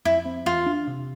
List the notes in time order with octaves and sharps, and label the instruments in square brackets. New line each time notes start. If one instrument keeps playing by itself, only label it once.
[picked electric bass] F2 [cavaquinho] E4
[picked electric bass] C4
[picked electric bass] E2 [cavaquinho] F4
[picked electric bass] D4
C3